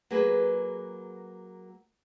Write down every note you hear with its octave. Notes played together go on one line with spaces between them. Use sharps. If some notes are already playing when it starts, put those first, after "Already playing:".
F#3 A#3 G#4 B4